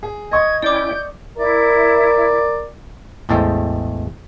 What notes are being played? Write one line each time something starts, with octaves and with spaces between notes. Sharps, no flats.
G#4
D#5 C#6 D#6 G#6
C#4 E4 D5 G5 D6 G6
E4 A#4 D5 E5
A1 E2 G#3 A4 C5 G5